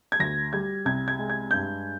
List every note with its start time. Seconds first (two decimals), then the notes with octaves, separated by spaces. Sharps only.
0.12 G#6
0.20 D2 A#6
0.53 G3 G#6
0.85 C2 G#6
1.08 G#6
1.19 G#3
1.30 G#6
1.51 G2 G6